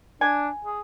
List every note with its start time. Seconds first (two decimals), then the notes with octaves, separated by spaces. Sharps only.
0.21 D4 G#5
0.65 G#4